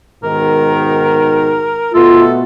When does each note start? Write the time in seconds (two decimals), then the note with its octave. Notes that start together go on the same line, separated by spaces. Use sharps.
0.24 G#2 B2 D#3 A#4
1.94 B2 A3 B3 F4 A4